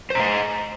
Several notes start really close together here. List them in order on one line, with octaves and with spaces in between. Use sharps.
C5 A#5 D#5